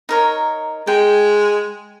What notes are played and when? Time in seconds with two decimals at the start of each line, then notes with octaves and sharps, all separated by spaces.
0.09 D#4 A#4 C#5
0.87 G#3 G5